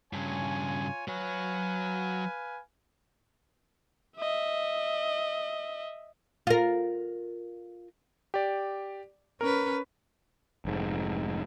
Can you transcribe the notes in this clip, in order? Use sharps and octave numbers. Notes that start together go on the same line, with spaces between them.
G2 C#3 F4 C#5 G#5
F#3 B4 C#5 F5 G#5
D#5 E5
F4 A#4
G4 D5
C#4 A#4 B4
F1 G#2